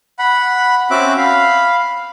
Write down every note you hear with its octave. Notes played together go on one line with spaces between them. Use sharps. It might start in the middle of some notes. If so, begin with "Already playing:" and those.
F#5 B5
C4 C#4 F#4 E5 D6 F#6
F5 B5